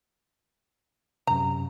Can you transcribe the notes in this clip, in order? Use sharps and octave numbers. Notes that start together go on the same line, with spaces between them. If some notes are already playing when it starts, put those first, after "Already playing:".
F#2 C3 A#5